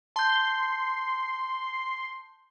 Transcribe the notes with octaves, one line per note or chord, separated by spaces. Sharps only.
A5 C6 G6